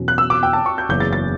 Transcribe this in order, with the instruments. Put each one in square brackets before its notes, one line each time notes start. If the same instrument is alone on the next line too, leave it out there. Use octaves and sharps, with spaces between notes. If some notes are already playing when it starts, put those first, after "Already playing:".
Already playing: [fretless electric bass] E2 B2 F#3 C#4
[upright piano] F#6
E6
D6
G5
A5
C#6
G6
[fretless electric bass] F#1 E2 C#3 [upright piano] G6
[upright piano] A6
A6